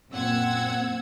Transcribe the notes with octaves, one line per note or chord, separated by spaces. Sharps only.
F#2 A#2 C4 F#5 E6 G#6